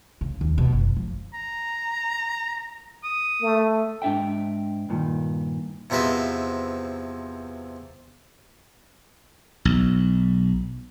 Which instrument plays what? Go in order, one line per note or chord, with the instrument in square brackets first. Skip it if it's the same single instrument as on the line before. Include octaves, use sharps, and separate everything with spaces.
[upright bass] C#3
D#2
B2
F#1
F3
[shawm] A#5
D#6
[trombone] A3
[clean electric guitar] G#2 D4 E5 G5
G2 A#2 D#3
[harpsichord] E2 C3 F3 B4 D#5 E5
[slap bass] B1